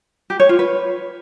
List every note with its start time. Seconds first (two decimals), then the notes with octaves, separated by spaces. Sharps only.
0.30 G4
0.40 C#5
0.49 F4
0.59 B4